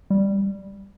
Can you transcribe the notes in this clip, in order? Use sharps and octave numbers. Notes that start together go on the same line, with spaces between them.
G3